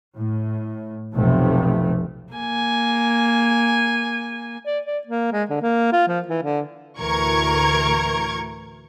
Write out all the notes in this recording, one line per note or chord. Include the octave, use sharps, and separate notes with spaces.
A2
F1 B1 C3 A3
A#3 G#5
D5
D5
A#3
G#3
D3
A#3
F4
F3
E3
D3
D2 A2 E3 A#4 C#6 G#6